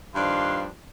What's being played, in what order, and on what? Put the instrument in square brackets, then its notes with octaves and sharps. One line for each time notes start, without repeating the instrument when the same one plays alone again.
[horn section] G2 D#3 F3 D4 F5 C6